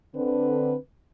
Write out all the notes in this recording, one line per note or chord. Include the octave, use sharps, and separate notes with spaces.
D3 C4 B4